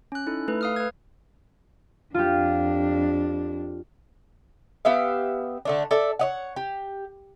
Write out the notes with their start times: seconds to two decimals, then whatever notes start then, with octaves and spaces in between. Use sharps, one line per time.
0.12 C#4 F#6
0.27 D#4 E4 A4
0.48 A3 A4 B4
0.61 F5 D#6 F6
0.76 B4 G#6
2.14 F2 D4 F4 G4
4.85 B3 G4 E5 F5
5.65 D3 A3 D4
5.91 A4 D5 E5
6.19 C#5 D#5 F#5
6.56 G4